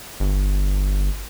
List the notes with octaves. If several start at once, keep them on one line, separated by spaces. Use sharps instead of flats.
G1